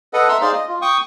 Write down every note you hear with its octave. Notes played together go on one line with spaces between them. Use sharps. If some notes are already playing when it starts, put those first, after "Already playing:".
A4 B4 D#5 F#5
E5 A#5 C6 E6
D#4 G#4 C5 D5 F5 C6
D#5
F4
G5 C#6 D#6